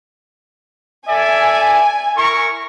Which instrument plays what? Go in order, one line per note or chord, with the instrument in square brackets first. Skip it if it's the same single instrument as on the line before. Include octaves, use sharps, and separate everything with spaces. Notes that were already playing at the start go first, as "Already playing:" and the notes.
[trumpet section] A4 D5 E5 [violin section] G#5
[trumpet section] E4 A#4 C#6